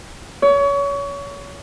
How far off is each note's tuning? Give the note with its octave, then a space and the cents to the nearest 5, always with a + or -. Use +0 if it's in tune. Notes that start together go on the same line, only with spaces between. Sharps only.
C#5 +30